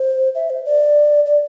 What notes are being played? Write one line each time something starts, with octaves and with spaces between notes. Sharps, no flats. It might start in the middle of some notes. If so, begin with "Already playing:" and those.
Already playing: C5
E5
C5
D5
D5